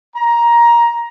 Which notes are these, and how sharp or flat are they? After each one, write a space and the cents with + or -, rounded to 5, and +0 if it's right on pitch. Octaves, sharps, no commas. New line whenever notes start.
A#5 +15